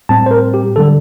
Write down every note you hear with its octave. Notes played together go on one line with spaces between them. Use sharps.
A2 G3 C4 A5
C5
A#4
G4
D3 G3 A4